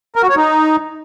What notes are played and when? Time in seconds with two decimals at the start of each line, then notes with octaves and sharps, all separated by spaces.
0.16 A#4
0.23 F#4
0.30 C#5
0.36 D#4